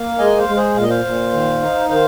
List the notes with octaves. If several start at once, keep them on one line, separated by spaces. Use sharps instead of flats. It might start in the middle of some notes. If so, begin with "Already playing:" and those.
Already playing: A#3 F5
G#3 D#5 G#5
C5 F5
G#3
G#4 C5
A#2 F5
D#5
C5 F5
A#2
D#3
D#4
D#3 C5 F5